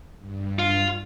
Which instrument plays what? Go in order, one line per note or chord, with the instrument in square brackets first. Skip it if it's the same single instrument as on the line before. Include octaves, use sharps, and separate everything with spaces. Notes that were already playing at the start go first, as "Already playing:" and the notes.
[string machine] G2
[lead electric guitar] F4